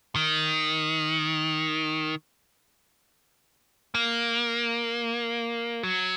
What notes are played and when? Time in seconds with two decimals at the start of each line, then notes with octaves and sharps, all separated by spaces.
0.16 D#3
3.95 A#3
5.83 F#3